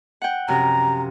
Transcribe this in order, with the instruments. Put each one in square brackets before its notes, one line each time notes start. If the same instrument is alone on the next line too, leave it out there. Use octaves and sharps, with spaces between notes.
[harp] F#5 G5
[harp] F#2 C3 F3 [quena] A#5